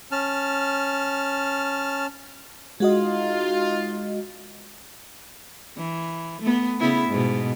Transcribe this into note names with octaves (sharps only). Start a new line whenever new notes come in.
C#4 A5 F6
G#3 D#4 F4 F#4 D#5
E3
A3 B3
C#3 B3 E4
G#2 B2